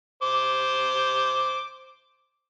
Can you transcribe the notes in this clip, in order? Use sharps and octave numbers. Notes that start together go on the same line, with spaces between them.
C5 D6